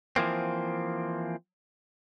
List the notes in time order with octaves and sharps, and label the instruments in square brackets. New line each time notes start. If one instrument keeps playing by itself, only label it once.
[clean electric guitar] E3 F3 A#3 C4